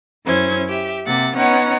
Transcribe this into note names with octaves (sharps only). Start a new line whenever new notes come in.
F#2 C#4 E4 C5 G#6
G4 E5
C3 A#3 E5 F#5 A6
B3 C#4 D#4 C#5 F#5